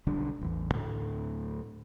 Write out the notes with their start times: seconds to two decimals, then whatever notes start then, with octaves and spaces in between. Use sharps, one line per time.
0.07 B1 D3 G3 D4
0.41 A1 E2
0.72 D2 A2